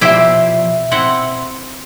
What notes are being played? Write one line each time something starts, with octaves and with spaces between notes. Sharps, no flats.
B2 F3 E4 G4 C5 D5 E5
C4 E4 F#5 C6